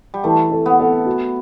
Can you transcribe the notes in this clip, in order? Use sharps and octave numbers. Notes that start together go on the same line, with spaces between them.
G3
E3 A3
A4
B3
A4
F#4